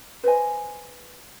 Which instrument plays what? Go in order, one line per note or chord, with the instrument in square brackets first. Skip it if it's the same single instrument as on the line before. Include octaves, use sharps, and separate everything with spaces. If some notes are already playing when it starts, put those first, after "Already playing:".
[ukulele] B4 C5 D#5 G#5